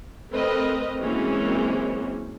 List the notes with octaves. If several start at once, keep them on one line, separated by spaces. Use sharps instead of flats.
A3 C4 A#4 B4 D#5
E3 F#3 G#3 A#3 C4 C#4